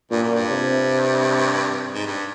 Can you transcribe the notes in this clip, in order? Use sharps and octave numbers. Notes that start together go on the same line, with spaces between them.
G2 A#2
F#2
G2
C3
G#2
G2